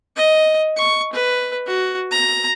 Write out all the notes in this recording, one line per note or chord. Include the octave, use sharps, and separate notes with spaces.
D#5
C#6
B4
F#4
A#5